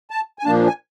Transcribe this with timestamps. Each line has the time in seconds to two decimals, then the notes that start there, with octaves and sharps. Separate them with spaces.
0.11 A5
0.39 G#5
0.45 A#2 F3 A#3 D4 A5
0.67 G#5